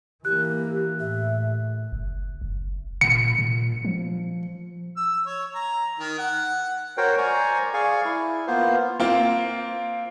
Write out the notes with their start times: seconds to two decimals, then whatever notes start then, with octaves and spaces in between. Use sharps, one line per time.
0.25 E3 A#3 G4 F#6
1.00 A2 E5
1.92 F#1
2.41 F#1
3.01 A#2 C#7
3.39 A#2
3.85 F3
4.97 E6
5.26 C#5
5.54 A#5
5.99 D#3
6.18 F#5
6.97 F#4 A#4 C5 C#5 G5
7.18 C5 D5 G#5 A#5 C#6
7.74 G#4 D5 F5 G#5 C#6
8.05 E4
8.47 A#3 B3 F4 C5
9.00 A#3 C4 F4